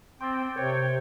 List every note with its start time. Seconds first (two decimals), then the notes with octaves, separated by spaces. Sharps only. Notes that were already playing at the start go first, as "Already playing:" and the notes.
0.21 C4 G5 C6 D6 A6
0.56 C3 A#4 C5 C#5 G5